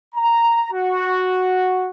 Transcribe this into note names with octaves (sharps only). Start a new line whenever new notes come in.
A#5
F#4